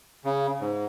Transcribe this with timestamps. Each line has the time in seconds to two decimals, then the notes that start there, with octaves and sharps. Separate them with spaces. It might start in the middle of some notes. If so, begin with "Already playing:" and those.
0.25 C#3
0.61 G#2